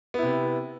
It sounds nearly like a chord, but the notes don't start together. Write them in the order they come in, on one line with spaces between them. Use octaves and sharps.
B3 E4 C3